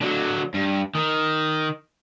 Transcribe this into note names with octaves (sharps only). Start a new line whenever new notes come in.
D3 F#3
G2
D#3